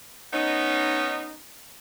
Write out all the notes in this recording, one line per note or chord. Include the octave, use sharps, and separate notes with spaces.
B3 C#4 D#4